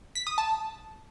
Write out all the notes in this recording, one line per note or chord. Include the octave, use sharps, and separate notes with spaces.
B6
D#6
A5